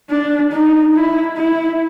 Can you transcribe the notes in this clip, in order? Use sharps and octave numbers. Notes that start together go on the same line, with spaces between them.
D4
D#4
E4
E4